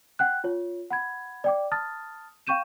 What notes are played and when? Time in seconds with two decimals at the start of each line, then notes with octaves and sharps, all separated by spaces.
0.19 F#5 G5 F#6
0.44 F4 C#5
0.91 F#5 B5 G#6
1.44 D5 G5 D6
1.71 A5 D#6 F6 A6
2.47 F5 G5 C#6 G6 D#7 E7